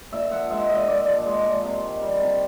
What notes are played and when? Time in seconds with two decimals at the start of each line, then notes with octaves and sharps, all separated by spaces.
0.12 A#2 E5
0.31 F3 F#5
0.50 G#3 E5
0.69 A#2 D#5
0.88 A#2 D5
1.07 F3
1.26 G#3
1.45 A#2
1.64 C3
1.82 D#3
2.02 G3
2.21 C3